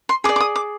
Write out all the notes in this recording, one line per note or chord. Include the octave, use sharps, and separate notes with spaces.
C6
G#4 D5 D6
D6
D#6
D6